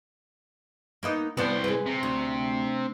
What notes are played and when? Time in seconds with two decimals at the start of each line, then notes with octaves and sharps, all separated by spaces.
1.03 A#3 B3 D#4
1.37 C2 B3 D4 C5 F5
1.64 G#3 B4
1.86 C3
2.03 D2